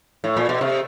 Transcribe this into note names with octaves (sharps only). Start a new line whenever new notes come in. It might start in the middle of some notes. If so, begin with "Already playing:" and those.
A2
A#2
B2
C3